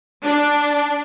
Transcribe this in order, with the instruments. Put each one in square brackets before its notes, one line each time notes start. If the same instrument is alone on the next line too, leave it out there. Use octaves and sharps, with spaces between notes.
[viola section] D4